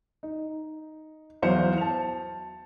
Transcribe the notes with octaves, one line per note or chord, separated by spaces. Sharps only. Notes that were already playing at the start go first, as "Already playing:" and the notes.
D#4
E2 F#3 E4 C5 F5 C#7
A5 F7